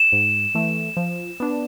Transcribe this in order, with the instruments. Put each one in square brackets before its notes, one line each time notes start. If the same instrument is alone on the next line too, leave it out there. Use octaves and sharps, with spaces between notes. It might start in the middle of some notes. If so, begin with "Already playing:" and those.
Already playing: [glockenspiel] E7
[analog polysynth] G#2
E3 A3
F3
B3 D4